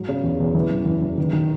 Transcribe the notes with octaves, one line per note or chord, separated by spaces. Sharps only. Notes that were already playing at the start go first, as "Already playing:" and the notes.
Already playing: G#2 F#3
C#3
E2
E2
E3
F#1
E3
F#1
D#3
D#3